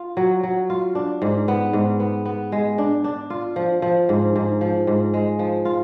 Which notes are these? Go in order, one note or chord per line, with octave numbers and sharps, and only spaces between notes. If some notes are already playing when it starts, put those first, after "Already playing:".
Already playing: F4
F#3
F#3
F4
D4
G#2
B3
G#2
B3
B3
G#3
D4
D4
F4
F3
F3
G#2
G#2
F3
G#2
G#3
F3
F4